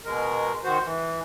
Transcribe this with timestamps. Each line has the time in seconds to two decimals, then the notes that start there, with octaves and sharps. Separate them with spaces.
0.05 B2 G#3 A#4
0.64 D#3 F#4 C5
0.83 E3